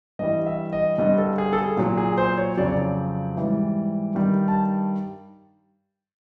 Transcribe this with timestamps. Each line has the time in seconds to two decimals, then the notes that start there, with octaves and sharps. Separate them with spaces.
0.19 G2 E3 G3 D#5
0.46 E5
0.73 D#5
0.98 G2 D3 G3 D#5
1.18 A4
1.38 G#4
1.53 A4
1.58 G#4
1.77 A#2 F#3
1.97 G#4
2.18 C5
2.38 C#5
2.57 F2 C#3 F#3 D5
2.65 C#5
2.72 D5
3.37 G#2 E3 G3
4.15 G2 D#3 G3
4.48 A5